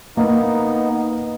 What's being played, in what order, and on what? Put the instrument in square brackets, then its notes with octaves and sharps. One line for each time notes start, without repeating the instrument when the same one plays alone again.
[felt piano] A#3 [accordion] B3 D#4